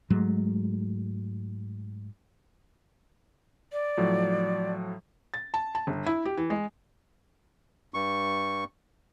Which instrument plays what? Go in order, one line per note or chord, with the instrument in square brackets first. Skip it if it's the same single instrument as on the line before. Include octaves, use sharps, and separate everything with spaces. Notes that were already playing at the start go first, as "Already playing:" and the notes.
[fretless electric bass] G#2 F#3 G#3 A3
[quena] D5
[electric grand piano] A2 F3 F#3
[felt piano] A6
A5
A5
G1
E4
G4
E3
G#3
[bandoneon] G2 C#6